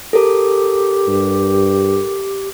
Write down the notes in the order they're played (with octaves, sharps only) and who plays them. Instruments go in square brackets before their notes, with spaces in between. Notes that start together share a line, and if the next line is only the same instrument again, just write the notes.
[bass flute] G4 [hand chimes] A4 A#4
[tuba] G2